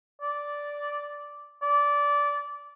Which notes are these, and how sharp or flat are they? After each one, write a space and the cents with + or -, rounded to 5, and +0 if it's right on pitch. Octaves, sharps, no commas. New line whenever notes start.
D5 -5
D5 -20